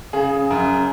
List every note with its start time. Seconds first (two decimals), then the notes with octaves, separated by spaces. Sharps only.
0.13 C#3 G#4
0.51 F#2